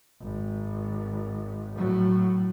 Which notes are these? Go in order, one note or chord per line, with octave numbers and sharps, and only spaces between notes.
G#1
A2 F#3